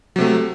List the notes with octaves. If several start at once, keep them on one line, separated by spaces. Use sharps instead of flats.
C3 F#3 A3